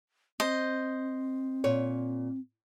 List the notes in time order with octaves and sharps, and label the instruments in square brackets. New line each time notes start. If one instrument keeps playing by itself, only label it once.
[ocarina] C4 [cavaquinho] C5 D#5
[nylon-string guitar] A#2 C#5